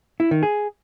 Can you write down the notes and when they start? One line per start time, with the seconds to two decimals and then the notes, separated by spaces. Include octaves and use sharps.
0.20 E4
0.31 D#3
0.43 G#4